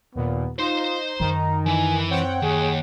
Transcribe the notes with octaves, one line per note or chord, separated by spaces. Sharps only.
D#2 A#2 B3
D#4 F4 C5 C6
F#2 D#3 D#4 A#5
E3 E4 G#5
C4 C#5 F#5 G5
D#2 G#4